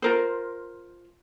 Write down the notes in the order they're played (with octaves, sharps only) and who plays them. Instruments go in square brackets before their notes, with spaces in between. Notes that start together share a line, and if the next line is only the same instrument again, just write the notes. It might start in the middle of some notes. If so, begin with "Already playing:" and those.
[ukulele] F4 A#4 C5